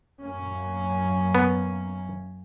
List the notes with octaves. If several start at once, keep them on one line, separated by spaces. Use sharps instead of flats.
F#2 A#3 C#4
B3